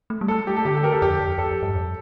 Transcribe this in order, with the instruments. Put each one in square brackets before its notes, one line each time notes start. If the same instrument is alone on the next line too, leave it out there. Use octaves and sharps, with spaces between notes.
[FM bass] A3
G3
[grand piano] A4
[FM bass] A3
[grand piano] G4
A4
[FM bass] D3 [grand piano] G4
[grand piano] A4
G4 A#4
A4
[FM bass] F2 [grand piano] G4
[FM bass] F2
[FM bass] F2 [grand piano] A4
[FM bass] F2
G2
F2